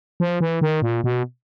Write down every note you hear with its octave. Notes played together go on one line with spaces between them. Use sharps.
F3
E3
D#3
A#2
B2